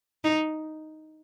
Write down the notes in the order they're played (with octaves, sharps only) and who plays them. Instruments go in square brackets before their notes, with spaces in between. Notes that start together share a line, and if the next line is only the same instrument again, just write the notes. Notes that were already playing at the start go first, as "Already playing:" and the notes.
[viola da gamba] D#4